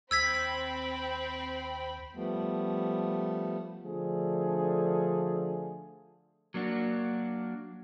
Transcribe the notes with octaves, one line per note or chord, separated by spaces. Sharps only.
D#2 C4 G5 B5 E6 G#6 B6
F3 G3 A3 B3
D3 F3 A3 D4 G#4 A4
F#3 A#3 D4 F#4